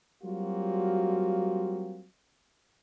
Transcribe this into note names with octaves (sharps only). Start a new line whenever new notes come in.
F#3 G3 A#3 C4 F4 F#4